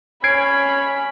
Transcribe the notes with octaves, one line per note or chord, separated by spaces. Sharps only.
C#4 B5 G#6 C7 D7